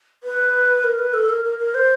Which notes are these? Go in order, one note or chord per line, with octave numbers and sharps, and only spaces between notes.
B4
A#4
B4
A4
A#4
A#4
A#4
C5